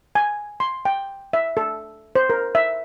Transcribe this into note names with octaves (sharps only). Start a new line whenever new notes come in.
G#5
C6
G5
E5
A4
C5
A#4
E5